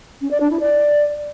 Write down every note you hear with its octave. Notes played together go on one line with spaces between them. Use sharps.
C#4
D5
D4
E4
D5